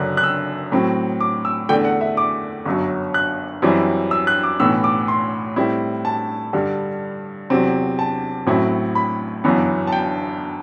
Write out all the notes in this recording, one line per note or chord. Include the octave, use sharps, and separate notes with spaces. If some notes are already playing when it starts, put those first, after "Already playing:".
Already playing: F#1 F#2 D3 F#6
F#6
E6
A2 F#3 C4
D6
E6
E2 D3 A3 G5
F#5
E5
D6
G1 F#2 F#3
F#6
F#2 E3 G3 C4 E4
E6
F#6
D6
B1 A2 E3 B3 E6
D6
C6
A2 G3 C4 E4
A5
G2 D3 G3
E2 C3 F#3 C4
A5
A1 A2 F#3 C4 E4
B5
G1 F#2 E3 B3
A5
G5